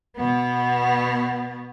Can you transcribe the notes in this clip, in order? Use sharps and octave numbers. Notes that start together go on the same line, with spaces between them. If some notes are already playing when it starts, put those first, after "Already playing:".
B2 B3